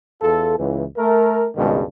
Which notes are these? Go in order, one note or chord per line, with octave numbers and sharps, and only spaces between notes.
E2 F4 A4
C#2 E3
A3 A#4
C#2 G2 B2 D#3 G#3